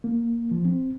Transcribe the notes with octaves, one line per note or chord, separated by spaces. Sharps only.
A#3
F3
C4